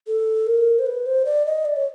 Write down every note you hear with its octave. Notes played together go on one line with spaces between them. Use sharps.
A4
A#4
C5
B4
C5
D5
D#5
D5
C#5